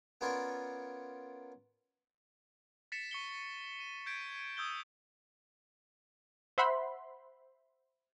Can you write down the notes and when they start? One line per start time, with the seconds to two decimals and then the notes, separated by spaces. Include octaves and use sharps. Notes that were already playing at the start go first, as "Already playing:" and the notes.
0.21 B3 C#4 F4 A#4 D5
2.92 A6 B6 C#7 E7
3.11 C#6 C#7 G7
3.80 D#7
4.06 G6 G#6 B6 D7
4.57 D#6 E6 G6 G#6 G7
6.58 C5 E5 F#5 B5 C6